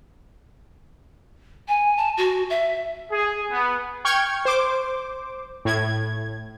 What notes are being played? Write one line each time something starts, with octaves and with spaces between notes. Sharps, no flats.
G#5
A5
F#4
E5
G#4
B3
G5 C#6 F6 G#6
C5 D6
A2 G#6